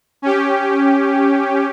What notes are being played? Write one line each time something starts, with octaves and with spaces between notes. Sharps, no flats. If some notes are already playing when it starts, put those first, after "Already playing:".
C#4 G4